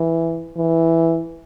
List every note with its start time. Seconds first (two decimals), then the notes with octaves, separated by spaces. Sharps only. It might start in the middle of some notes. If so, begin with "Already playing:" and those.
Already playing: E3
0.57 E3